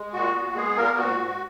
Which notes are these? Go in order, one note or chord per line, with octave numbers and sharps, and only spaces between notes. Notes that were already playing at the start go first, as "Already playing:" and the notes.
Already playing: G#3
A#2 F#4
B3
G#3 B3 G#4
A#2 A#3 A#4
G#2 F#4
G#2